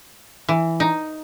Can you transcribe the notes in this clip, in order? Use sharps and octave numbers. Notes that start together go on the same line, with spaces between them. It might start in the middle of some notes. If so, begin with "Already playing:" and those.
E3
D#4